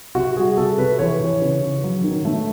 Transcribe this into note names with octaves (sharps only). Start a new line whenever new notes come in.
C3 F#4
G3 G#4
C3 A4
C3 B4
E3 C#5
E3
C#3
C#3
F#3
D#3
A3